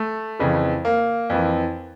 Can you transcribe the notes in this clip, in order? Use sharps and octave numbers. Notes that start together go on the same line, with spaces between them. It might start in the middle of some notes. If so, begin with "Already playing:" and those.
Already playing: A3
F2 C#3 E3
A#3
F2 E3